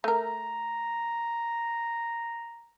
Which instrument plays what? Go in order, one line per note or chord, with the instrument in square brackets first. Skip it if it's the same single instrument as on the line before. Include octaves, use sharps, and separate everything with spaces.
[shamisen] A3 A#4 [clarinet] A#5